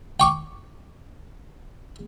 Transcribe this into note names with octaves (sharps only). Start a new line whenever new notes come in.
G5 C#6 D6